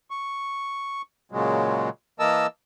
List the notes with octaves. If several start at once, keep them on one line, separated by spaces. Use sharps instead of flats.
C#6
A#2 C#3 F#3 G#3
E3 A#3 A#4 D#5 A5 E6